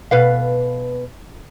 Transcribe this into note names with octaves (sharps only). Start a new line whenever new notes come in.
B2 B4 F5